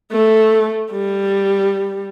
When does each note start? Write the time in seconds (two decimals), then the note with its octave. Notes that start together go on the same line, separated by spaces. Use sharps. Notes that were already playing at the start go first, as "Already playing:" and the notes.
0.12 A3
0.92 G3